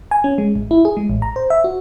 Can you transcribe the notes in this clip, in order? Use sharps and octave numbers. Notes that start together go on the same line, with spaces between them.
G#5
C#4
G#3
A1
E4
G#4
G#3
A1
A#5
C5
E5
F#4